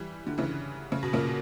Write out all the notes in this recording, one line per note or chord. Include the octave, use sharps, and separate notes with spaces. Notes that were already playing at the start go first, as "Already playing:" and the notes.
Already playing: E3 G3
D3
C#3 E3
C#3
B2
A#2 C#3